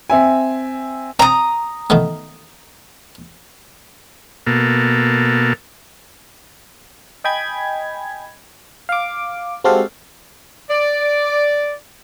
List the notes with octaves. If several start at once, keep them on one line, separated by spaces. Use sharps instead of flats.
C4 E5 G#5
C4 A#5 D#6
D#3 A3 B3
B2 A#3 A4
D#5 G5 G#5 B5 G#6
F5 D6
G#3 C4 F#4 G4 A4 F5
D5